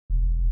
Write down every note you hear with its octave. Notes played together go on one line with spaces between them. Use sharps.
E1